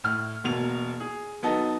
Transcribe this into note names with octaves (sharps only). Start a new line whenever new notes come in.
A2 F6
E1 B2 A#3 F7
G#4
F#3 B3 D#4 A4